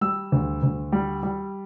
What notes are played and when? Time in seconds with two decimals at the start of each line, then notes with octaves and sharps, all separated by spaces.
0.01 G3 E6
0.32 D2
0.63 D2
0.92 G3
1.23 G3